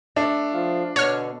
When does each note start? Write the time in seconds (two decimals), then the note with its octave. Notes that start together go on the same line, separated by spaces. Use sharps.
0.16 A3 D4
0.53 F3 F4 F5
0.96 B2 D3 C#5 F6